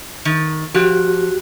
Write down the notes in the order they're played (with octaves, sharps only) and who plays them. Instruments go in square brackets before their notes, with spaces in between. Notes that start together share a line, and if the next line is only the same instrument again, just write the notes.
[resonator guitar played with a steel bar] D#3
[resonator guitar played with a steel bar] F3 G5 [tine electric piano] F#4 G4 F#6